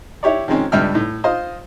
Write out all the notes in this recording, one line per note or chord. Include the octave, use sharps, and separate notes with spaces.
E4 G4 C#5 D5
D#3 F3 G#3 C4 C#4
C#2 G2 G3 E5 G5 F6
A2
F4 C5 D#5